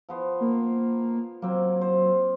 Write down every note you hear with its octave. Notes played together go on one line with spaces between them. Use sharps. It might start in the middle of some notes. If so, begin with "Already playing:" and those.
F3 B3 C5
A#3
F#3 A#3 C4
C5